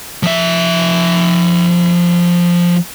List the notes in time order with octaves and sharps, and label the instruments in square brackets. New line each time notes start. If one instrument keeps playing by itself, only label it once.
[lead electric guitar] F3 E5